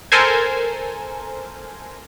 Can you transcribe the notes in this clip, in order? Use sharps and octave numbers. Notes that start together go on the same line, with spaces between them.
A4 A#4 C5 G#5